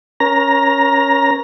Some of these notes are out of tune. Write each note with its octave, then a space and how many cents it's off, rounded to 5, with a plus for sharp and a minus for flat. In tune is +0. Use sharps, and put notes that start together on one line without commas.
C#4 +0 A#4 +30 A#5 +0